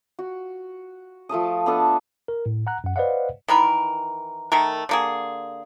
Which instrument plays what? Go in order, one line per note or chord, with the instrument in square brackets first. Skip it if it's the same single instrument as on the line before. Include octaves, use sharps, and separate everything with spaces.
[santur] F#4
F3 A3 A5 D#6
B3 D4 A4
[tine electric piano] A#4
A2
F#5 A#5 F#6
F#2 F#5
B4 C5 D5 D#5 F5 F#5
[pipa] D#3 E3 A#4 B5
D#3 A3 A#4
D3 A#3 G#4